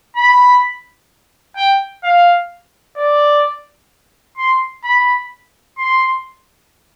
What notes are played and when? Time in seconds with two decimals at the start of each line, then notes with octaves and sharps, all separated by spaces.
0.16 B5
1.56 G5
2.03 F5
2.97 D5
4.37 C6
4.84 B5
5.78 C6